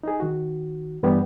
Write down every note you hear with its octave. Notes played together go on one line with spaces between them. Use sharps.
D#4 G#4
D#3 F#4
G2 E3 G3 B3 G4